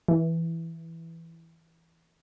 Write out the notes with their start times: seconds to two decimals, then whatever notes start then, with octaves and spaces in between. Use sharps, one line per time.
0.08 E3